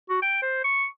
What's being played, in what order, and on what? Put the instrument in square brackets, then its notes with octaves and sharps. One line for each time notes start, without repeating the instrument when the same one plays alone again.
[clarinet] F#4
G5
C5
C#6